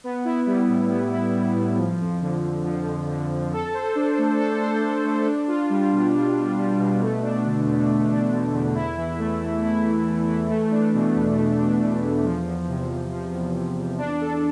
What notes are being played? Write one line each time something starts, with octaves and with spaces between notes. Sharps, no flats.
B3
E4
G3
A2
B3
E4
G3
A2
F3
F2
D3
F2
F3
F2
D3
F2
A4
C5
D4
A3
A4
C5
D4
A3
D4
F4
G3
B2
D4
F4
G3
B2
A3
D4
D3
E2
A3
D4
D3
E2
E4
E3
A3
E3
E4
E3
A3
E3
A3
D4
B2
E2
A3
D4
B2
E2
F3
E2
C3
E2
F3
E2
C3
E2
D4
A4